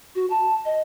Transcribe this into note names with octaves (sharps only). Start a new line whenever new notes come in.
F#4
A5
D#5